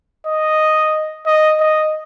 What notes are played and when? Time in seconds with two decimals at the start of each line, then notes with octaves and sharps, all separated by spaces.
0.26 D#5
1.26 D#5
1.60 D#5